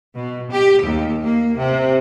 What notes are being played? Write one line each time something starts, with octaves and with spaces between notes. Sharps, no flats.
B2
G4
D#2
A#3
C3